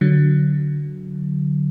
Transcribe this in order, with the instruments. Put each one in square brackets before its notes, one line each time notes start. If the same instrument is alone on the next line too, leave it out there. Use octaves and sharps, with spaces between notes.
[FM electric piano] D3 F#3